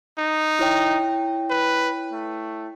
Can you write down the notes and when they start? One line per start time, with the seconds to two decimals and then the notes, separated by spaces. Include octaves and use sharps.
0.18 D#4
0.59 E4 C#5 G5
1.50 B4
2.11 A3